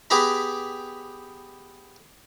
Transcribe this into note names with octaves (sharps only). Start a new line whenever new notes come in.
B3 G4 G#4 A#5 B5